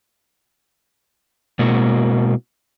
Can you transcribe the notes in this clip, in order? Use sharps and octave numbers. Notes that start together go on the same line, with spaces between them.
B2 G#3 A#3 C4 E4 F#4